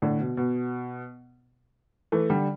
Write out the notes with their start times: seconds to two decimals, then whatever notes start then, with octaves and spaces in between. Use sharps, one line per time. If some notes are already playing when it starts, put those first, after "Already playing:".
0.02 A2 D3
0.20 B2
0.37 B2
2.12 E3 A3
2.30 D3 G3